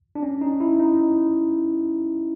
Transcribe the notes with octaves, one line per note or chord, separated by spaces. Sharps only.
D4
C#4
D#4
E4
D#4